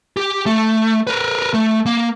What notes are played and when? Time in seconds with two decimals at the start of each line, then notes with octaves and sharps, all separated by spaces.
0.17 G4
0.46 A3
1.07 A#4 B4
1.54 A3
1.86 A#3